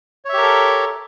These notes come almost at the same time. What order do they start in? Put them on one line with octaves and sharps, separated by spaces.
C#5 E5 G4 A#4 A4